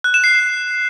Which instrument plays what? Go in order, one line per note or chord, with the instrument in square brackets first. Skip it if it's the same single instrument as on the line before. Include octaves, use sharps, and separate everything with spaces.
[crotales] F#6
E7
C7